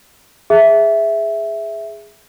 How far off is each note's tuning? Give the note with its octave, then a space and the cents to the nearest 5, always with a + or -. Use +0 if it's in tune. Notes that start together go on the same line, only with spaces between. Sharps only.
G#4 +0 E5 +0